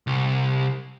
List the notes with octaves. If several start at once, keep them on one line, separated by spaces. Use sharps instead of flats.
C2